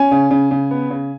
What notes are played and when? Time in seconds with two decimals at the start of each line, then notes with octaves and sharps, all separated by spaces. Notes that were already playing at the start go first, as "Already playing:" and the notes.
Already playing: C#4 G#5
0.11 C#3
0.31 C#3
0.51 C#3
0.71 B3
0.90 C#3